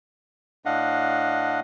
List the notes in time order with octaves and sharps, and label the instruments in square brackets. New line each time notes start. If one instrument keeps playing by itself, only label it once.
[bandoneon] A2 D4 D#5 F5 F#5